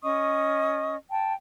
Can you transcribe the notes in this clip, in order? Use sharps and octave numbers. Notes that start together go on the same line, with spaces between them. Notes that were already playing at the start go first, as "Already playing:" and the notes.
C#4 D#5 C#6 D#6
G5 A5